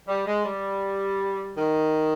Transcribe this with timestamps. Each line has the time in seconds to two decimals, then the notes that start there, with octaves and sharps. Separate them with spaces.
0.08 G3
0.27 G#3
0.45 G3
1.57 D#3